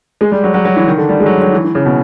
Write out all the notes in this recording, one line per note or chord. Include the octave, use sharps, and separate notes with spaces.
G#3
G3
F#3
F#3
F#3
E3
D#3
D3
G3
G#3
F#3
G3
F#3
E3
E3
C#3
B2